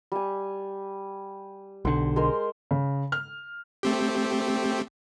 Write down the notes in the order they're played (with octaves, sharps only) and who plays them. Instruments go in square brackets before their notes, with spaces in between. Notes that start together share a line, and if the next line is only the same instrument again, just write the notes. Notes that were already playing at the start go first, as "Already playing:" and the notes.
[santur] G3 G#5
[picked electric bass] B1 D3 [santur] C5
[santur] G#3 A#4 C5
[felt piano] C#3
F6
[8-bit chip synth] A3 C4 G4